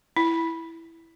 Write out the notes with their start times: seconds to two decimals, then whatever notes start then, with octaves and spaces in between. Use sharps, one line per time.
0.17 E4